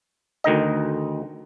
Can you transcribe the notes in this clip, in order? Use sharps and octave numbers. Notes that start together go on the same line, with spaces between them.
D2 D#3 D#4 D#5